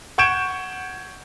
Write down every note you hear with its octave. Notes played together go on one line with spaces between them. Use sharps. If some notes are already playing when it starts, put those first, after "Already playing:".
F#5 C#6 G6 G#6 D7 E7